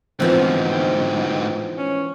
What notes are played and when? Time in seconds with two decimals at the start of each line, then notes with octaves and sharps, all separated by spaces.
0.20 D2 G#2 E3 F3 B3 C4
0.72 G5
1.78 C#4